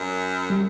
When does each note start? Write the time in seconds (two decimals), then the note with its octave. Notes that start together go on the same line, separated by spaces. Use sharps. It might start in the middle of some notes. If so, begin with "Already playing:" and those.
Already playing: F#2
0.50 G3